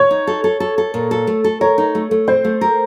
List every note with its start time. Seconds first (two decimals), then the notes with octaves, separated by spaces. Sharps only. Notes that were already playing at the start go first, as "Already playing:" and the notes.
Already playing: C#5
0.11 D#4
0.27 A4
0.44 A4
0.60 A4
0.78 A4
0.94 A#2
1.11 A4
1.27 A3
1.44 A4
1.61 A#4 C#5
1.78 D#4
1.95 A3
2.11 A3
2.28 C4 C5
2.45 A3
2.61 A#4